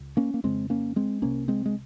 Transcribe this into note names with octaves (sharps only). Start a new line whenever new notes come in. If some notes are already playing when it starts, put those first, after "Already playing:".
Already playing: C#2
A#3 C#4
A#3
F2 C#3 G#3 C4
A#3 C#4
G#3 C4
C2 C3 A#3 C#4
G#3 C4
G#3